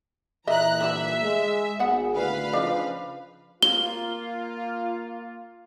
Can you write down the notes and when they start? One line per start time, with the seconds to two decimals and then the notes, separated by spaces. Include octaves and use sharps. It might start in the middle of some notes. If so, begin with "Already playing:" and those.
0.47 A#2 E3 D#5 E5 A#5 F#6
0.81 D3 F3 G3 E5
1.23 G#3
1.79 G#1 B3 G#4 F#5
2.16 G#1 A2 D3 B4 F5
2.53 C#3 F3 D4 D#4
3.62 A#3 F4 G7